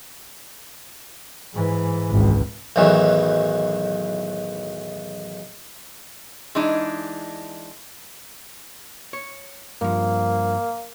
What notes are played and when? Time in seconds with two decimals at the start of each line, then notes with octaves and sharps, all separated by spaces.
1.53 G#2 E3
2.12 G#1 C#2 F#2
2.76 B1 E2 A2 D#3 E3 F#3
6.55 E3 G#3 D4 D#4
9.13 C#5
9.81 G2 F3 A#3